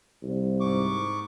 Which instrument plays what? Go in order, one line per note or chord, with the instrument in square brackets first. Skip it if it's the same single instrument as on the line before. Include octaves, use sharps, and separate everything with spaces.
[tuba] C2
[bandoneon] G#2 C#6 D6